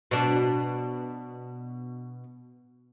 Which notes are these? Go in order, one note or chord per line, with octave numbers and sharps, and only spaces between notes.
B2 D4